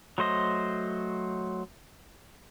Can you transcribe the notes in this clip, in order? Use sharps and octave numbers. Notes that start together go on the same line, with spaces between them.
F#3 A3 C5 D#5